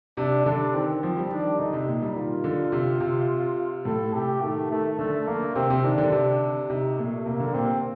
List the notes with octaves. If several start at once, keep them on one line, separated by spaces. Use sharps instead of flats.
C3 D4
D3 D4
D#3 C4
F3 C4
G3
D#3 D4
D3 D#4
C3
A#2
G3
D#3 F4
D3
C3
C3
A2 A4
C3 G4
D#3 A3
D#3 A3
D3 A3
D3 A#3
C3 C4
C3
D#3 D4
D3
C3
C3 D#4
A#2 A3
C3 A#3
D3
A#2 C4